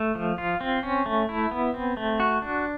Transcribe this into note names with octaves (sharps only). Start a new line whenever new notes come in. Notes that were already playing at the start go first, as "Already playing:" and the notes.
Already playing: A3
F3
F4
C4
C#4
A3
E4
B3
C4
A3
F#4
D4